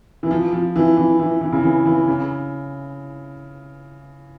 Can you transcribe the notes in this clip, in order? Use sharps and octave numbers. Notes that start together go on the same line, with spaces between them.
E3
F3
F3
E3
E3
E3
E3
C#3
E3
E3
C#3